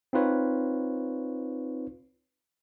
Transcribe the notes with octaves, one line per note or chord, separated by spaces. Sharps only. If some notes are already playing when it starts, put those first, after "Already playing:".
C4 D#4 F4 B4 C#5